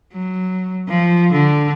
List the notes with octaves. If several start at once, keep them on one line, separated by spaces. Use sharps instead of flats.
F#3
F3
D3